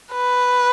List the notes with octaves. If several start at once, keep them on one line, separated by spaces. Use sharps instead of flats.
B4